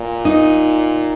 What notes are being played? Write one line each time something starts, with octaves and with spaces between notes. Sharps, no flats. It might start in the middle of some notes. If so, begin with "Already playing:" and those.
Already playing: A#2
D#4